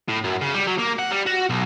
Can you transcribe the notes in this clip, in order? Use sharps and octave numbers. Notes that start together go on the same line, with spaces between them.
A2
F#2
C#3
G3
F#3
A#3
F#5
G3
F#4
B1